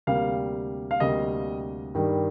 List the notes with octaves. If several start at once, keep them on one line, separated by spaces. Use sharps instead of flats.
D2 C3 G3 A#3 F5
F5
D2 C3 G3 A#3 D#5
G2 D#3 G3